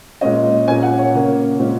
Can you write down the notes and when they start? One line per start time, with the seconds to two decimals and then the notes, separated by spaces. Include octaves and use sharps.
0.21 A#2 G#3 C#4 D#5
0.67 A#2 A#3 C#4 G#5
0.83 F#5
0.98 C#5
1.14 C#3 A#3 C#4
1.59 A#2 G#3 C#4